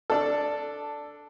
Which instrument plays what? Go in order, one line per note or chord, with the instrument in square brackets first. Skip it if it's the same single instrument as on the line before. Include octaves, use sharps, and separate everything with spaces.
[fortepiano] D4 A4